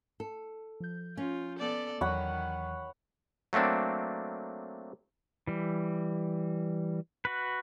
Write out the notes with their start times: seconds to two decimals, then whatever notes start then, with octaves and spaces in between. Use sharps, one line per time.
0.20 A4
0.80 F3 G6
1.17 C#4 F4
1.59 B3 A4 D5
2.01 E2 D#3 E3 F#3 C#5 F#5 B5
3.53 F#3 A3 A#3 C4 D4
5.47 E3 G3
7.25 F#4 B4